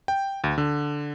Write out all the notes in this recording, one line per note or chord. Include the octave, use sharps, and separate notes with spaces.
G5
D2
D3